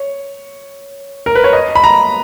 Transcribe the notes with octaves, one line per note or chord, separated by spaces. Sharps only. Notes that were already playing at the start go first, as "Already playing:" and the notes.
Already playing: C#5
A#4
B4
C#5
D#5
B5
A#5